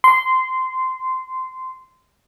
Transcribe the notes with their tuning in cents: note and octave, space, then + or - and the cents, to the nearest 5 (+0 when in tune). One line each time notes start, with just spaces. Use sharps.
C6 -15